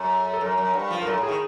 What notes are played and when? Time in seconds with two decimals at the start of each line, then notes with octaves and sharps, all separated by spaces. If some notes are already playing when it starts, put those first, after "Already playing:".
Already playing: F#2 A4
0.33 A4
0.41 F#2 A#4
0.58 F#2
0.73 G2
0.91 F3
1.02 G2 A#4
1.07 F#2 A4
1.18 A2
1.23 G#4
1.29 D#3